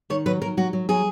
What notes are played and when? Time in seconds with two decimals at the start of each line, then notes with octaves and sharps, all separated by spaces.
0.10 D#3 C#5
0.26 F#3 B4
0.41 F#3 A#4
0.57 F#3 F#4
0.73 F#3
0.89 F#3 G#4